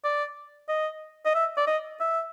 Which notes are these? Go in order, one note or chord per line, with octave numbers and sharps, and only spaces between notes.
D5
D#5
D#5
E5
D5
D#5
E5